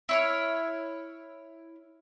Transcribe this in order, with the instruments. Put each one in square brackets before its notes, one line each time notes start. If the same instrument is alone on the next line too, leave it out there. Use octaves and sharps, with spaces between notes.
[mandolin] E4 C#5 F6